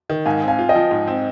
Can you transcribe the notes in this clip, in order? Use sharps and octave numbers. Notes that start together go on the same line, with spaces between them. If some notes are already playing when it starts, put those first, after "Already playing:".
D#3
G#2 F5 G#5
C4
F5 G#5
F4
D#5 G5
F3
G#2
C4